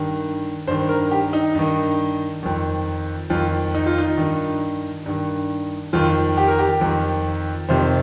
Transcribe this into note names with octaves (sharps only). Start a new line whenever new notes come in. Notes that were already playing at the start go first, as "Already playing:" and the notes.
Already playing: G2 D#3
G2 D#3 C5
A#4
G4
D#4
G2 D#3
F2 D#3
F2 D#3 F4
D#4
F4
D#4
G2 D#3
G2 D#3
F2 D#3 F4
G4
A#4
G4
F2 D#3
F2 C3 D#3 C5